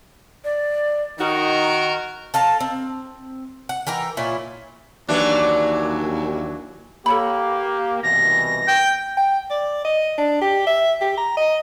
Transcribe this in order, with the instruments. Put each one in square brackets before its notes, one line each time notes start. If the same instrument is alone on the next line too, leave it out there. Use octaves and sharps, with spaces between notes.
[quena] D5
[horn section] D#3 F#4 A#4 [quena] D#4
[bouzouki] A4 F5 A5 A#5
C4
F#5
E3 A#4 G5 A#5
A#2 C#4 E4 F4
[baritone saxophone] D#2 [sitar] E3 F#3 D4
[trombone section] A#3 G4 [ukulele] A4 C#5 B5
[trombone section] C2 B2 E3 [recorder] A#6
[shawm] G5
[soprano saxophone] G5
D5
D#5
D4
G4
E5
G4
A#5
D#5